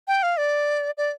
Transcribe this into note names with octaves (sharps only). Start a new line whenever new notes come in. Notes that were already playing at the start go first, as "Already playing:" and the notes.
G5
F5
D5
D5